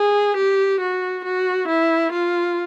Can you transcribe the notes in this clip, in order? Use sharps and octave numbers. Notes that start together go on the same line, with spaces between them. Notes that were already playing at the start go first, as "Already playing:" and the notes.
Already playing: G#4
G4
F#4
F#4
E4
F4